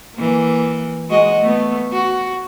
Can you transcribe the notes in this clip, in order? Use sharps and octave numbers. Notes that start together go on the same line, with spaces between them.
E3 A#3
G#3 F#4 D#5
A3 B3
F#4